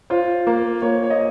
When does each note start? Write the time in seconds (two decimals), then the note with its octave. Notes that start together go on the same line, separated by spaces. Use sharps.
0.10 F4 C5
0.47 A#3
0.82 A#3 C#5
1.03 C#5
1.10 D#5